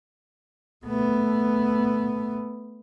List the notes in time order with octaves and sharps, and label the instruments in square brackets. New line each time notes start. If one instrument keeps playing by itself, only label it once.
[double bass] A3 B3